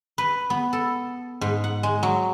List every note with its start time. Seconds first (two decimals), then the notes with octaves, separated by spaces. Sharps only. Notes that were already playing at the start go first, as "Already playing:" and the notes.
0.18 B4
0.50 B3
0.73 A4
1.41 G#2
1.64 F#5
1.83 G#3
2.03 F#3